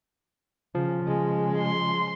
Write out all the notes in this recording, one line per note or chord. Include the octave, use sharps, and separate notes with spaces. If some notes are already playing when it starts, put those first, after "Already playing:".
C#3 F3
C#3 G#3
C6